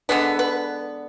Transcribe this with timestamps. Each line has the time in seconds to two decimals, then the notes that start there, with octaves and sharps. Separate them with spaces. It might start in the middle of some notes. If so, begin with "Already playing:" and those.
0.09 D3 G#3 B3 B4
0.39 B4